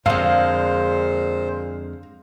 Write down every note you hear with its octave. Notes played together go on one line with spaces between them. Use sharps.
F2 A#2 D3 G#3 C5 F5